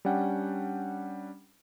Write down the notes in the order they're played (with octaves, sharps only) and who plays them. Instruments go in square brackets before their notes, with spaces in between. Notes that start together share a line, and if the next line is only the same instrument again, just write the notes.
[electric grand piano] G3 C#4 D4 F#5 G5